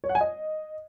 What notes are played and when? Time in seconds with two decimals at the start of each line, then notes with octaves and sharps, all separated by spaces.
0.04 C#5
0.09 F#5
0.15 G#5
0.21 D#5